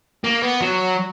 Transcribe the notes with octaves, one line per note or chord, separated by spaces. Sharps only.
A#3
B3
F#3